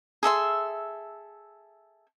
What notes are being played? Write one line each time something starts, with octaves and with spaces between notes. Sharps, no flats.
G#4 A4 E5 C6